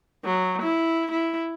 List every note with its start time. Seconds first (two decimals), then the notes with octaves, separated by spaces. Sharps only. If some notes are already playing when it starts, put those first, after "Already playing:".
0.25 F#3
0.62 E4
1.12 E4